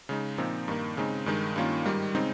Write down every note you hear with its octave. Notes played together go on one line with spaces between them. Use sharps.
C#3 G#3 D#4
A#2 F3 C4 D#4
G2 D#3 A#3
C#3 G#3 C4 D#4
G2 D#3 G#3 D#4
G2 D#3 A#3 C#4 F4
G#2 D#3 G3
C#3 G#3 C4 D#4